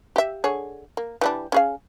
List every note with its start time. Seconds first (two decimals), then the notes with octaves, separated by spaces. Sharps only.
0.16 G4 E5
0.44 D3 G#4 C#5
0.97 A#3
1.21 E3 G3 D4
1.52 C#4 G#4 F5